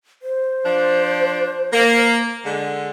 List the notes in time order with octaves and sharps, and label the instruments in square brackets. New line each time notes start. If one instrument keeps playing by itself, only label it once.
[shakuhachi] C5
[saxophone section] F3 D4
A#3
D3 G#3